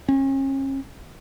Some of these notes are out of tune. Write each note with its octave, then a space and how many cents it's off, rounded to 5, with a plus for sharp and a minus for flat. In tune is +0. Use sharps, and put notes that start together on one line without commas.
C#4 -35